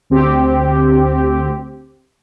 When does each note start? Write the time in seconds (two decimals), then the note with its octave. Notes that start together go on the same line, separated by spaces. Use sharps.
0.10 D2 C4 G4